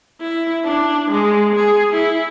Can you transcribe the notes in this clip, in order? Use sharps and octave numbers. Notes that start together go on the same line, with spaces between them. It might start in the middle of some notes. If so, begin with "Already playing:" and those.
E4
D4
G#3
G#4
E4